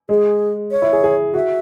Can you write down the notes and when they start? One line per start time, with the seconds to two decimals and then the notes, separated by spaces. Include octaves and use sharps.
0.09 G#3 G#4
0.71 C#5
0.82 E4
0.93 G#4
1.04 G#4
1.34 F#4 E5